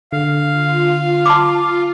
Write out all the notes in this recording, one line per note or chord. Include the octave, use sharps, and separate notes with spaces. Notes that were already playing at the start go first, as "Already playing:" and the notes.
D3 F5
F4
A5 C6 D6